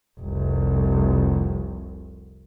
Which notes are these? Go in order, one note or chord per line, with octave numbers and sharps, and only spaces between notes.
F1 C2